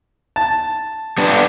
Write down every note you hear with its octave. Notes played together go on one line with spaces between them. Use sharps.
A5
G3 B3 D4